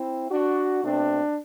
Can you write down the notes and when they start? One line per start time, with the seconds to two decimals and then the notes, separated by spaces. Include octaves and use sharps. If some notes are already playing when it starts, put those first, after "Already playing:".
Already playing: C4 E4
0.30 D4 F#4
0.83 B2 A3 C4 D4